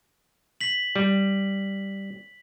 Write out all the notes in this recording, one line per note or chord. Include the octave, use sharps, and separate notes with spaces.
B6 F#7
G3